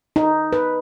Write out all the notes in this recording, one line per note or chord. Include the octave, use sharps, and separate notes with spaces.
D#4
B4